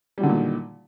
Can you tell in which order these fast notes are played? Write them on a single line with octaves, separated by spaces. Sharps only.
G3 F#3 D3 D#3 A#2